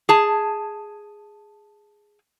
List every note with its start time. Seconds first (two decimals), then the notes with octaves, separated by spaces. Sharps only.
0.09 G#4 A5